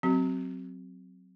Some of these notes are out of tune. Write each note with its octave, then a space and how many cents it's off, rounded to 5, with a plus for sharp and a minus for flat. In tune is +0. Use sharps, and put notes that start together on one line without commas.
F#3 +0 C4 +0 F#4 +35